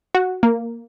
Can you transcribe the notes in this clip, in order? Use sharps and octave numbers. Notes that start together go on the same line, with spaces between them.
F#4
A#3